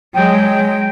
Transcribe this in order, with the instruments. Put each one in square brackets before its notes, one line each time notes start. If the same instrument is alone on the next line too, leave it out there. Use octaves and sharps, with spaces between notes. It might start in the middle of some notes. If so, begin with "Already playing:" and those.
[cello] F#3 G#3 [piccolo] G5